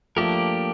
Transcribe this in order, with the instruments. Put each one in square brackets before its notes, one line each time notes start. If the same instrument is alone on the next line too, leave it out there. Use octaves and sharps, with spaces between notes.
[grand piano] F3 A3 [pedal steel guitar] A#3 D4 G4 A#4